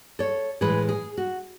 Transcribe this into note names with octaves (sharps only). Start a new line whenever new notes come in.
A4 C#5
A2 E3 G#3 G#4 B4
G#4
F#4